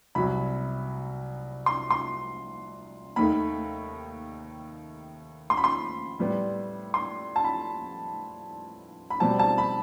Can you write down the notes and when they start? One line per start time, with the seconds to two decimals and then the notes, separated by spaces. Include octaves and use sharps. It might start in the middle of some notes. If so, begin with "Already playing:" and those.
0.15 C2 C3 F#3 B5
1.66 C6
1.91 C6
3.16 D#2 D#3 A3 B5
5.50 C6
5.57 B5
5.64 C6
6.19 A2 G3 B3
6.94 C6
7.36 A5
7.44 B5
9.10 B5
9.20 B2 G3 C4 A5
9.39 A5
9.58 B5